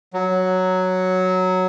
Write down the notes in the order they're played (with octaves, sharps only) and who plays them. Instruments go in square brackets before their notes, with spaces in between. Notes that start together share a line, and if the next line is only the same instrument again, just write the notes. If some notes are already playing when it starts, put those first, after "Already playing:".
[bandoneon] F#3